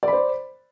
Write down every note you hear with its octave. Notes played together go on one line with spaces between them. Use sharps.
C5 D5 B5